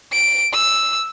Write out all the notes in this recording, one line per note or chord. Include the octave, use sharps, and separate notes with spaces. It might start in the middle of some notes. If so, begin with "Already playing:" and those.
D7
E6